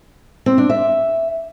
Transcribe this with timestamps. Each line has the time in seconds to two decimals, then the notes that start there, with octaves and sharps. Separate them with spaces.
0.46 C4
0.58 D4
0.70 E5